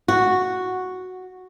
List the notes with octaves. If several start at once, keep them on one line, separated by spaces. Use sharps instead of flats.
F#4